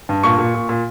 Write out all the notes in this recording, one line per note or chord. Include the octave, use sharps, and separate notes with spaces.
G2
A#2 C#6
A#2
A#2
A#2